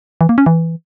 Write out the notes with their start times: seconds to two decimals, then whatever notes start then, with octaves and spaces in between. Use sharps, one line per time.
0.21 E3
0.29 A#3
0.38 C#4
0.46 E3